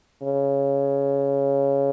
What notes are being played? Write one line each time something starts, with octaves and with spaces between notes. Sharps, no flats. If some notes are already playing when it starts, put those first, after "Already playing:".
C#3